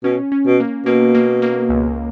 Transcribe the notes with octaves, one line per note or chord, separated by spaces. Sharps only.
B2 C#4
C#4
B2
A#3
B2 A#3
A#3
A#3
C#2